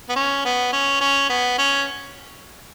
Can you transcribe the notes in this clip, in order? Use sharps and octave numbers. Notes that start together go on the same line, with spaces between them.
B3
C#4
B3
C#4
C#4
B3
C#4